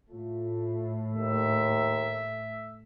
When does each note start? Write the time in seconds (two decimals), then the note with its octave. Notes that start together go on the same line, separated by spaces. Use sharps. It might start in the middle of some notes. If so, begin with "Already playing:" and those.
0.11 A2 A3 F4
1.11 D#2 E5